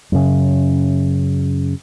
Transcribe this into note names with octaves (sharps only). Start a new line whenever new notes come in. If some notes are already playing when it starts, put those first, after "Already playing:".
F#2 C#3